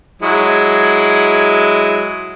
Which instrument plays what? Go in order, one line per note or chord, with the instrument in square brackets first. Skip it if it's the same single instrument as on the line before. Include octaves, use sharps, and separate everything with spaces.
[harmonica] F#3 G#3 E4